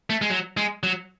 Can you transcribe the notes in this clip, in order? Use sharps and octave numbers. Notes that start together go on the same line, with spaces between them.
A3
G#3
F#3
G#3
F#3